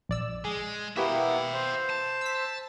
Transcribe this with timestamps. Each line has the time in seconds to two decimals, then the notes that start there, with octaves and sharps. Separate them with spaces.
0.09 A#1 D5 E6
0.45 G#3 G#4
0.97 A#3 B3 E4 F#4 G4 B4 E5 G5
1.54 C5
1.90 A5
2.21 E6 B6